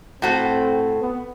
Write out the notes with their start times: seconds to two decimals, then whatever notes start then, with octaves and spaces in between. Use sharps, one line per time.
0.22 A2 C4 F#4 A4
1.01 B3